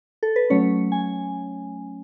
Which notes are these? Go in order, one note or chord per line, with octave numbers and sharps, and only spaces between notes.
A4
B4
F#3 A3 C#4 C#5
G#5